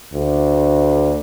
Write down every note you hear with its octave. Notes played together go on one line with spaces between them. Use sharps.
D2